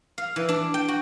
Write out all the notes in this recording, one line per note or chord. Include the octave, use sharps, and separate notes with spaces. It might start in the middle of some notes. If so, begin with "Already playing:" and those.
F5
E3
D4
G5
F#4